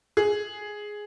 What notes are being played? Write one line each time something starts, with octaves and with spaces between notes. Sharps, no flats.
G#4